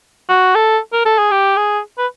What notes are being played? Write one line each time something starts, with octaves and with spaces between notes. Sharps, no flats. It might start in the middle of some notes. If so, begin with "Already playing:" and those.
F#4
A4
A#4
A4
G#4
G4
G#4
B4